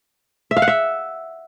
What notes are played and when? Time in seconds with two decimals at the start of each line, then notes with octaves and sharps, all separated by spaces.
0.51 E5
0.57 F5
0.62 F#5
0.68 E5